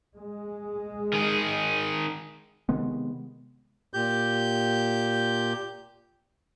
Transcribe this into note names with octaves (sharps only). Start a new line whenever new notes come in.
G#3
D#3 G#4
C3 D#3 G#3 B3
A#2 G4 G6